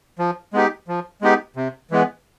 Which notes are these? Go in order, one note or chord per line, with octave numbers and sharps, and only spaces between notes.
F3
G#3 B3 D#4 G4
F3
G#3 B3 D#4 G4
C3
E3 G#3 B3